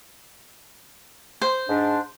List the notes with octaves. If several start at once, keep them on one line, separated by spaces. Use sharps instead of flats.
C5
G#2 D4